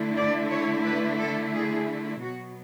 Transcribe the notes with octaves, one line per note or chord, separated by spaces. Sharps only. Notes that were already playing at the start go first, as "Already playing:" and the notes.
Already playing: D3 A3 E4
D5
C#5
B4
A4
G#4
B2 F#3 B3 F#4